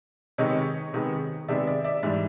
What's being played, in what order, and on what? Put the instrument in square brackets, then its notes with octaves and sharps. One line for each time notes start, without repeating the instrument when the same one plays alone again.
[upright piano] C3 D#3 G#3 B3 C#5 D#5
C3 D#3 G#3 B3
C3 D#3 G#3 B3 D5 E5
D5 E5
D5 E5
G#2 E3 G3 D5 E5